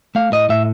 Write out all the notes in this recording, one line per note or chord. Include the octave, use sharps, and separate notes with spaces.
A3 F5
A2 D#5
A2 E5